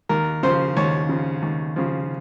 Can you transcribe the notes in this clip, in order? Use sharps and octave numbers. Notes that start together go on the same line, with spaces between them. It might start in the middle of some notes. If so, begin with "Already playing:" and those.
D#2 A#4
C#3 F3 C5
D#2 C#5
C#3 F3
D#2
C#3 F3